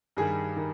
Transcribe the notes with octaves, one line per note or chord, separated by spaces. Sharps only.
G2 D#3 G3 G#4
D#3